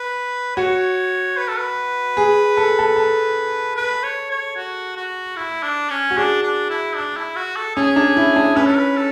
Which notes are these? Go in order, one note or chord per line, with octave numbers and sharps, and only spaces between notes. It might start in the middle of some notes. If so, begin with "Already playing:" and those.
Already playing: B4
F#4 C#5
B4
A4
B4
G#4
A4
A4
A4
B4
C#5
C#5
F#4
F#4
E4
D4
C#4
F#4
D4 G#4
D4
E4
D4
E4
F#4
A4
C#4 G#4
D4
E4
D4
C#4 B4
A4
B4
A4